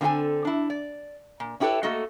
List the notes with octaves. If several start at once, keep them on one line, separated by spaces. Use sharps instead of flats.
D3 A#3 C4 F4 A4 G#5
D4 E4
D5
A#2
C#4 E4 G4 A4 B4 C#5
A3 A#3 F#4 A4 D#5